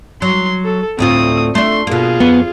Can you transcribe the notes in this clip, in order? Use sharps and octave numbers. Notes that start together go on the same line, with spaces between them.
F#3 C6
A4
D2 A2 C4 F4 D#6
A3 D4 C6
B2 A#3 F4 G#4
F2 B3